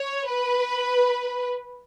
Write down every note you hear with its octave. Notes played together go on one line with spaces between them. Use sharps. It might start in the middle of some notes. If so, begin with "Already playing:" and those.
Already playing: C#5
B4